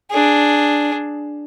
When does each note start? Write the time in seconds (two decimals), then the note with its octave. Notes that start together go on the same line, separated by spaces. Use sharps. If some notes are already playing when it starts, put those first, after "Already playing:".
0.11 D4 G#4